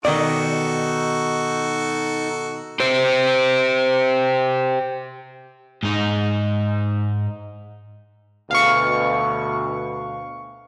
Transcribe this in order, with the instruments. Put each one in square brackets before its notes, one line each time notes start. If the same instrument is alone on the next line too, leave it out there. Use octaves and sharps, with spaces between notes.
[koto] B2 D#3 D#5 [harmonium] D#4 [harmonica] F#4 A4 [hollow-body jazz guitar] D5
[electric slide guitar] G4 C5
[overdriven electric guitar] G#2 D#4
[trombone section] D2 B2 [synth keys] F5 C#6